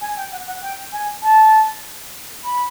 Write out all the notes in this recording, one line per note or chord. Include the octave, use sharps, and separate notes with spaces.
G#5
G5
F#5
F#5
G5
G#5
A5
B5